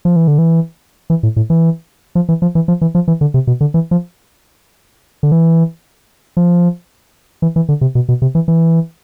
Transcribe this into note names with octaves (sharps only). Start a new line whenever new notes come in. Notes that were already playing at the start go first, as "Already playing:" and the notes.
F3
E3
D3
E3
E3
A2
A2
E3
F3
E3
F3
E3
F3
E3
F3
E3
D3
C3
B2
D3
E3
F3
D3
E3
F3
E3
E3
D3
C3
B2
B2
C3
E3
E3